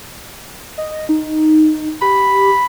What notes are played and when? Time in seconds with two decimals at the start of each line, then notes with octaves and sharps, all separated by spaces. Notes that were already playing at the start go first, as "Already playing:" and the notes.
0.78 D#5
1.09 D#4
2.02 G4 B5